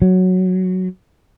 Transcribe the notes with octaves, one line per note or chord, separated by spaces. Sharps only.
F#3